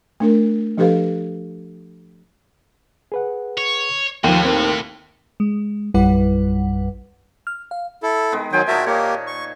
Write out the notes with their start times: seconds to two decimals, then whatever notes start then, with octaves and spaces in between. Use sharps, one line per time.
0.20 A3 D4 A#4
0.77 F3 D4 G4 A4 B4 F5
3.12 G#4 B4 F#5
3.58 C#5
4.24 D#2 A2 F3 G5
4.45 C4 A#4
5.40 G#3
5.94 A#1 F#2 G3 E4 B4 F#5
7.47 F6
7.71 F5
8.03 E4 A4
8.32 D#3 G#3 B3
8.53 D#3 F#3 C5 G5 G#5
8.68 A#2 F#4 G#4 A#4 E5 A5
8.86 A#3 G4 A#4 C#5 D#5
9.27 C#6